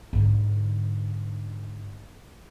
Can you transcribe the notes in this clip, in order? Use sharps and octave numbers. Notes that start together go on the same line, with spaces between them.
G#2 D3